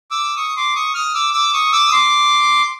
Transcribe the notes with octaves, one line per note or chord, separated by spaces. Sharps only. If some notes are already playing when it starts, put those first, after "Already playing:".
D6 E6
C#6 D#6
C6 D6
C#6 D#6
D#6 F6
D6 E6
D6 E6
C#6 D#6
D6 E6
D#6
C6 D6